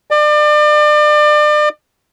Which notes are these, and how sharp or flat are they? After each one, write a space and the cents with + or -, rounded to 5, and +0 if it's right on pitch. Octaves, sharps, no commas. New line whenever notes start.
D5 +35